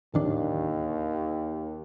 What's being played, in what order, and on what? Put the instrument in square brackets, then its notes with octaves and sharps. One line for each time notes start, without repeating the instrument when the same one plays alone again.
[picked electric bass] D1 D#3 D4 [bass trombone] D#2